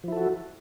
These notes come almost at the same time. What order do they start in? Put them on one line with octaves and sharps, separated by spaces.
F3 E4 A4 F#4